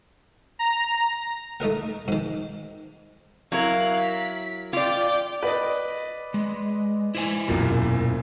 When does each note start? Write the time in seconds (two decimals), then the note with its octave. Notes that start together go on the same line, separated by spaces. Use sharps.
0.59 A#5
1.60 A3 D#4 A#4 F#5
2.08 G#2 D#3
3.52 F#3 E4 A#4 F5 F#6
4.00 B6
4.73 F4 D5 G5 D6
5.43 B4 D5 D#5
6.34 G#3
7.15 E4 C5 G#5
7.48 E1 F#2 A#2